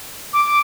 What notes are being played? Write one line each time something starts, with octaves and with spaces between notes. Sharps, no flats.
D6